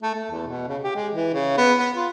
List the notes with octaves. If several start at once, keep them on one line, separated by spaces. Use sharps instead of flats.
A3
A3
E2
B2
C#3
G4
G#3
E3
C#3
B3
B3
F4